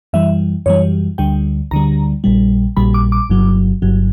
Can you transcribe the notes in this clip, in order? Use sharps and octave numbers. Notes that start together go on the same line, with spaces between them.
F#2 E3 G3 E5
F#2 E3 G3 C#5
D2 D3 G3 G5
D2 D3 G3 A#5
A#1 A#2 G3
A#1 A#2 G3 B5
D6
D6
G1 G2 F#3
G1 G2 F#3